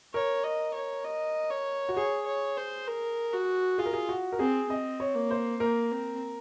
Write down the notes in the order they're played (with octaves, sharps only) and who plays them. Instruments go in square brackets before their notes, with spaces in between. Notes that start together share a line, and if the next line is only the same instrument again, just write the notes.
[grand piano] A#4 [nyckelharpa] C#5
[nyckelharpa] D#5
C#5
D#5
C#5
[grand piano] F#4
[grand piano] G#4 [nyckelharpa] C#5
[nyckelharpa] C#5
C5
A#4
F#4
[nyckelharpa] F4 [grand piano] G#4
[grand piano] A#4
G#4
F#4
A#4
[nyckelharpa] C4 [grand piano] G#4
[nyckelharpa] C4 [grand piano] D#5
[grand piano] C#5
[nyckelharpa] A#3
[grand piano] C5
[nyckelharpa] A#3 [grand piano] A#4
[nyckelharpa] C4